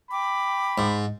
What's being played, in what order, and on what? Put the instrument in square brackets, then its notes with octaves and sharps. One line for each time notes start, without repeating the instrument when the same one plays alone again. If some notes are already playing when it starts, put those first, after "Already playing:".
[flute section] G5 D6 [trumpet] B5
[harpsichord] G#2